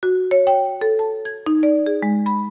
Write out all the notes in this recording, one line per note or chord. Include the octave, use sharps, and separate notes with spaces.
F#4
C#5
G5
A4
A5
G#6
D#4
D5
G#4
G#3
B5